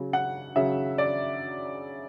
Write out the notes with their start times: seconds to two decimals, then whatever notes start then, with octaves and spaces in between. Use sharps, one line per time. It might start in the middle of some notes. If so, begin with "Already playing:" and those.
Already playing: C#3 F#3
0.13 F#5
0.56 C#3 F#3 E5
0.98 D5